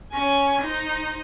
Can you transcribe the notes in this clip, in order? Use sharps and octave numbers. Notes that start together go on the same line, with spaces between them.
C#4 G#5
D#4 C5